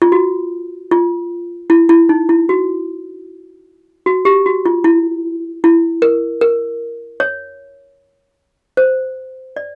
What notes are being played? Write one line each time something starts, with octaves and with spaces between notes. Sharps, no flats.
F4
F#4
F4
E4
E4
D#4
E4
F#4
F#4
G4
F#4
F4
E4
E4
A#4
A#4
C#5
C5
D5